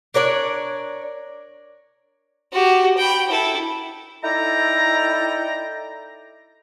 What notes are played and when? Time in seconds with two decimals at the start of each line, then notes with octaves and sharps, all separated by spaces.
0.14 D4 A#4 C#5 D5
2.52 F#4 G4
2.97 G5 B5
3.29 E4 A4
4.24 D#4 E4 A4 D5 G5 A#5